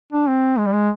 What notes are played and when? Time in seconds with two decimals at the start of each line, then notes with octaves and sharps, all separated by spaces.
0.12 D4
0.28 C4
0.58 G#3
0.66 G3
0.73 G#3